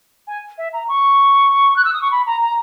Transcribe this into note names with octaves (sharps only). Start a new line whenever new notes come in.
G#5
E5
A#5
C#6
F#6
E6
D#6
C#6
B5
A#5
A#5